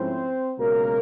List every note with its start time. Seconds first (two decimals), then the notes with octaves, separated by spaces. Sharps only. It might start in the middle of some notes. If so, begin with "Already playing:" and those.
Already playing: G#2 F3 A3 C4 C#4 E4 C5
0.58 C#2 B2 F#3 A#3 A#4